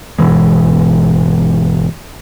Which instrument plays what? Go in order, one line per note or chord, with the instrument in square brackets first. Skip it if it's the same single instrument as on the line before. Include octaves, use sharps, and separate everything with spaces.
[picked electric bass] G1 B2 E3 G#3